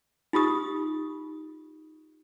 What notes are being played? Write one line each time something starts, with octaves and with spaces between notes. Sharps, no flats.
D#4 F4 G4 D#6